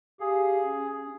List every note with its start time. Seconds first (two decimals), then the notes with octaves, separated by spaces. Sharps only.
0.20 G4 G#4 F5
0.64 C#4